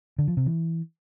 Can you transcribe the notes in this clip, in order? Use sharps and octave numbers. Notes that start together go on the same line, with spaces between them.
D3
F3
C3
E3